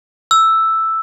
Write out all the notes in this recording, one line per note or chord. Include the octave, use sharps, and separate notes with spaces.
E6